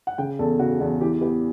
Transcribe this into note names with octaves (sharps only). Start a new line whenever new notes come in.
F#5
C#3 G5
E2 A4
C#3 F#4
E2 F#4
E3 G4
B3 G4